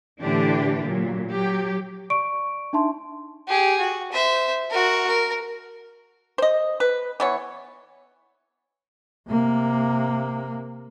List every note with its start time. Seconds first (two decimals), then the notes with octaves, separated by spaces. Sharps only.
0.20 A2 D3 E3 D4 G4
0.84 A#2 F#3
1.30 F#3 G4
2.10 D5 C#6 D7
2.73 D4 D#4 E5 A5 C6
3.47 G4 G#4
3.79 F#4
4.12 C5 E5
4.70 F#4 A#4
5.07 A#4
6.38 C5 D#5
6.80 B4
7.20 E3 B3 C#5
9.28 C3 A#3